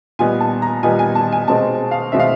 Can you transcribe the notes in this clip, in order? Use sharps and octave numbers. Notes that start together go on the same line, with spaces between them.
A#2 G3 B3 D#4 G#5
A5
A#5
A#2 G3 B3 D#4 G#5
G#5
A5
G#5
B2 G#3 C4 D#4 A5
F5
B2 G#3 C4 D#4 E5
F5